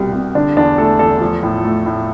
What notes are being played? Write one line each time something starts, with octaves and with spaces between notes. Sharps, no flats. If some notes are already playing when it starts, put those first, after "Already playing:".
Already playing: C2 B2 G3
C2
D3 D4
E2 D4
A3 A4
E2 A4
F3
A2
A3
A2